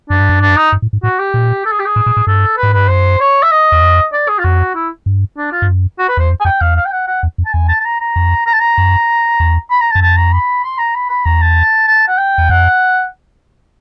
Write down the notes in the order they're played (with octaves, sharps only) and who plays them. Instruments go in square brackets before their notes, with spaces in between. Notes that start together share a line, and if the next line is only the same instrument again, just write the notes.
[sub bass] F#2 [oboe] D4
[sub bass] G2
F#2
[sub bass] G2 [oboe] D4
[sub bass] F#2
[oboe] D#4
[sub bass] G2
A2
G#2
[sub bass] A2 [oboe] F#4
[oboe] G4
[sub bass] A#2
[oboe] A4
G#4
G4
G#4
[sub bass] A2
A#2
A2
[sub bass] G2 [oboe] A4
[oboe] B4
[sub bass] G#2
[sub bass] G2 [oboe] B4
[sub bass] F#2 [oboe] C5
[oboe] C#5
E5
D#5
[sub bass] E2
F2
[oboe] D5
G#4
F4
[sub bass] F2 [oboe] F#4
[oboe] E4
[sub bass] G2
[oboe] D4
F4
[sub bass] G2
F#2
[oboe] F#4
B4
[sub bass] E2 [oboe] C5
[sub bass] F2
[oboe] G#5
[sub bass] F2 [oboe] G5
[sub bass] E2 [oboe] F5
[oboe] F5
G5
F#5
F#5
[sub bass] E2
F2
[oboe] A5
[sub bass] E2 [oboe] G#5
[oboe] A5
A5
A#5
A#5
[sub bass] F2
[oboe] A#5
A5
A#5
[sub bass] F#2
E2
[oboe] B5
A#5
A5
[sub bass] F#2
[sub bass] F2 [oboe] A5
[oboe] A#5
B5
C6
A#5
B5
B5
[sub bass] E2 [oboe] A#5
[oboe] A5
A5
F#5
G5
[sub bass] E2
[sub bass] F2 [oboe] F#5